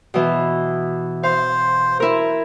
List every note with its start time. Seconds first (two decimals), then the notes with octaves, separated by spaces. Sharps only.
0.14 B2 E3
1.23 C5 F5
2.00 E4 A#4